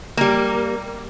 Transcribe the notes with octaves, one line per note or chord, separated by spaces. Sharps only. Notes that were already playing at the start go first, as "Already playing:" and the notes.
G3 A#3